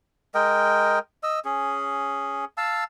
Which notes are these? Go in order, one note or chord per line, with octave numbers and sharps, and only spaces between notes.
G#3 A#4 D#5 G5
D#5 E6
C#4 G#4
F5 A5 E6